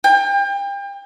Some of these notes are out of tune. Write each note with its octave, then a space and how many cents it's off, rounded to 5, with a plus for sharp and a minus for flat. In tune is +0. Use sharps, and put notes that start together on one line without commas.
G5 +35